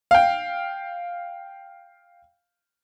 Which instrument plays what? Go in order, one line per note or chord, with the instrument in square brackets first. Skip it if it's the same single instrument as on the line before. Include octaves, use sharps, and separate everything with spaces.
[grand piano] F5 G5